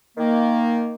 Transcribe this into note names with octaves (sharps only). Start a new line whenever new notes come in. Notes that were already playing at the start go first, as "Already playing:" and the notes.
D#3 A#3